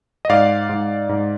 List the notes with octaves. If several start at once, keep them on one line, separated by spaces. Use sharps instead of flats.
D#5
G#2 D5 F5
G#2
G#2